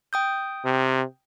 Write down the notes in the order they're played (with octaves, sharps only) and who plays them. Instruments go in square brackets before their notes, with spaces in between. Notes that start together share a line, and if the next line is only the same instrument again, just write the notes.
[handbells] G5 D#6 G6
[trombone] C3